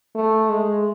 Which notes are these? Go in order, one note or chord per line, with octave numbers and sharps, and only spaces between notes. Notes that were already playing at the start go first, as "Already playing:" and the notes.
A3
G#3